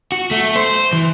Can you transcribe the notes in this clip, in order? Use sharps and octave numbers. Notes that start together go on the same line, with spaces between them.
F#4
A3
C5
E3